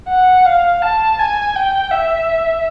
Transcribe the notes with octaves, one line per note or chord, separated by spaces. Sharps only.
F#5
F5
A5
G#5
G5
E5